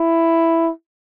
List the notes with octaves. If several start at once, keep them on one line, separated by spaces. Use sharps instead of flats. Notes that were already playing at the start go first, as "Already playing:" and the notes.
Already playing: E4